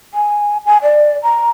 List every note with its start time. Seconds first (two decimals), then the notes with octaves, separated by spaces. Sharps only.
0.14 G#5
0.66 G#5
0.83 D5
1.23 A#5